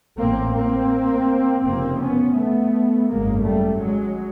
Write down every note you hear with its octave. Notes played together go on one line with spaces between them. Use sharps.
A1 A2 A#3 C4
A#3 C4
F1 F2 C#3 A#3 C4
B3 C#4
A3 B3
G#1 F#2 C#3 G#3 A#3
G3 A3
F#3 G#3